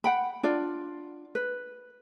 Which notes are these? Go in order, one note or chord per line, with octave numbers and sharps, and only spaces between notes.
F#5 G5 B5
D4 F4 D5
B4